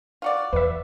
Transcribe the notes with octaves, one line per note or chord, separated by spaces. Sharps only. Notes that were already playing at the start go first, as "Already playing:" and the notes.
F4 F#4 D5
E2 B4 E5